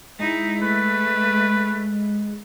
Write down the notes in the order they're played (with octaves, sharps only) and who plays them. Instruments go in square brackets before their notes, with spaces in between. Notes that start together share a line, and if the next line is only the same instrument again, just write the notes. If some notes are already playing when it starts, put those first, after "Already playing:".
[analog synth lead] G#3 [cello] D#4 E4
[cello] A3 [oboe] B4